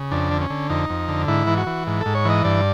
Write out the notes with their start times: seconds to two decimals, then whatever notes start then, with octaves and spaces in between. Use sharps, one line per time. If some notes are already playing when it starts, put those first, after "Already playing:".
Already playing: C#3
0.11 F2 D4
0.31 D3
0.41 C#4
0.50 D3
0.70 F2 D#4
0.90 F2
1.08 D3
1.28 G#2 E4
1.47 E3
1.57 F#4
1.67 E3
1.87 G#2
2.01 G#2 A4
2.15 C#5
2.25 E3 D#5
2.44 G2 D5